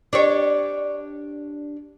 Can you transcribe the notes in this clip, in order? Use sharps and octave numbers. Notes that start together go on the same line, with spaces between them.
D4 G4 C#5